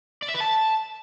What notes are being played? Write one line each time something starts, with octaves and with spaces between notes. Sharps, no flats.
D5
E5
B4
A5